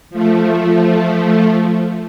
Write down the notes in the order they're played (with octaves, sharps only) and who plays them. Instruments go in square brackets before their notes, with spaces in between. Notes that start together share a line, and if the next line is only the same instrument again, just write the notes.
[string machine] F3 A3